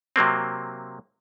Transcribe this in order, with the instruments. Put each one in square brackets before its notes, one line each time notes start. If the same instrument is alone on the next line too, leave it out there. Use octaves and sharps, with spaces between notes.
[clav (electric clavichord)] C3 F#3 A#3 C4